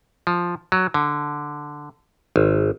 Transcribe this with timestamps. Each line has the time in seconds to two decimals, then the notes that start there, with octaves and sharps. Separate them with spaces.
0.27 F3
0.72 F#3
0.94 D3
2.36 G#1